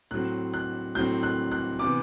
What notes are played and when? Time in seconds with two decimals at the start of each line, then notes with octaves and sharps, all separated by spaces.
0.11 A2 F#3 C4 F#6
0.54 F#6
0.95 A2 F#3 C4 G6
1.23 F#6
1.52 F#6
1.79 C3 E3 B3 D6